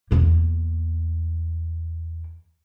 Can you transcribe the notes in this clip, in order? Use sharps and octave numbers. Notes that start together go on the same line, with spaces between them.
E2 A#3